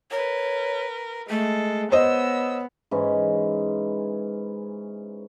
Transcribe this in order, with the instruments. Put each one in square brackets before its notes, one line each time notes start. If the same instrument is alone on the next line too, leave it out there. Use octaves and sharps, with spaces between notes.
[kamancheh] A#4 B4 [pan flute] C#5
[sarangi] G#3 [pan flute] A3 [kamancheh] A4
[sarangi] B3 [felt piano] C5 D#5 [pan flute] C#5 [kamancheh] E6
[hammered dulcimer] G#2 E3 C#4